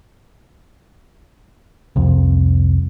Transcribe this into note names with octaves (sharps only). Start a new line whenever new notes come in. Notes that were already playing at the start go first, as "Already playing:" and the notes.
C2 F2